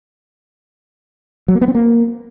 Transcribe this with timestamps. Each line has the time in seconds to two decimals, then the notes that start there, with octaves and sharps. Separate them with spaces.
1.48 F#3
1.55 A#3
1.62 B3
1.68 C4
1.75 A#3